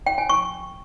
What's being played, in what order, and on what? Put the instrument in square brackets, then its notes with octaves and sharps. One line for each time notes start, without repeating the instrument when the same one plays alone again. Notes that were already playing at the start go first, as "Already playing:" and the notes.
[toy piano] G5
G#5
C#6